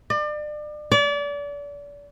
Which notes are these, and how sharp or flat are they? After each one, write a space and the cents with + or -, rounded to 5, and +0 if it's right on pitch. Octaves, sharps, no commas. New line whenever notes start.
D5 +35
D5 -35